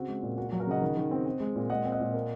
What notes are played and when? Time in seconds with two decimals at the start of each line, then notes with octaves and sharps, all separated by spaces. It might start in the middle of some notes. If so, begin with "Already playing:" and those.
Already playing: C#3 C4 F#4
0.08 G#3
0.23 A#2
0.38 A#3 F#4
0.49 F#4
0.52 F#3
0.60 F#4 A#4
0.67 C#3 D#5 F#5
0.82 D#3
0.97 D#3
1.11 C4
1.26 C4
1.40 G#3
1.56 A#2
1.70 G#3 D#5 F#5
1.85 C4
1.92 D#5 F#5
2.00 A#2
2.14 A#3